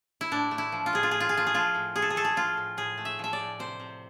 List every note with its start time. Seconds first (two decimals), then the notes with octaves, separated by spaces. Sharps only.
0.21 E4
0.31 A2 D4
0.51 A3
0.58 E4
0.72 F3
0.86 F4
0.93 A2 G#4
1.03 F4
1.11 A2 G#4
1.20 F4
1.29 G#4
1.34 A3 F4
1.47 G#4
1.54 F3 F4
1.75 A2
1.95 A2 G#4
2.02 A4
2.10 G#4
2.16 A3 A4
2.25 G#4
2.36 F3 F4
2.57 A2
2.77 A2 G#4
2.98 A3
3.05 E5
3.19 F3 E5
3.33 D5
3.39 A2
3.59 C3 C5
3.80 C3